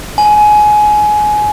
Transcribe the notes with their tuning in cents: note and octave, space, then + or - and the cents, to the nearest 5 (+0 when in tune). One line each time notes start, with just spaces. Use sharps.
G#5 +20